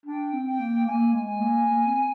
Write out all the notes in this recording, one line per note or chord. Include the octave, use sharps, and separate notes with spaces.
D4 G5
C4
G5
A#3
A#3 G#5
G#3
G#5
A#3
A#3
C4